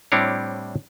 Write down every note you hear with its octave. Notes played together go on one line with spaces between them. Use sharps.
A2 G3 C4 D4 E4 C#5